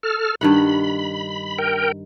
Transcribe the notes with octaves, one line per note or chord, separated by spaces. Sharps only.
A4 F6
G2 D#3 F#5 B5
A#4 G5